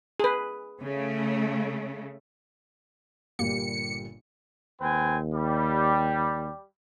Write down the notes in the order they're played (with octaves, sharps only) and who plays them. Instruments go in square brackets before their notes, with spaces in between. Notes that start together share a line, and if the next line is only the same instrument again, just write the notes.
[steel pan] G#4 B4
[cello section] C#3 A3
[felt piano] G1 A#2 G3 [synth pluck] A#3 [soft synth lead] G4 [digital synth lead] C#7
[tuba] D#2 [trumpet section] C4 B4 G#5
[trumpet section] G3